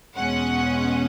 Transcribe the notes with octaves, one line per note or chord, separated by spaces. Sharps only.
E2 B2 G#3 C#4 F#5